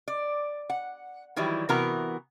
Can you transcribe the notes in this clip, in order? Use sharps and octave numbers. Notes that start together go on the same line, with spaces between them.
D5
F#5
D#3 E3 F#3 G3 E4
C3 E3 B3 F#4 A#4 A#5